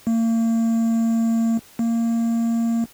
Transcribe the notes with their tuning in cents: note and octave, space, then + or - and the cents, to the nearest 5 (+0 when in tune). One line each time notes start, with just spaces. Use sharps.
A#3 -40
A#3 -20